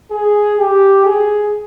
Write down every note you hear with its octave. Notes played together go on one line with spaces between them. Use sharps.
G#4
G4
G#4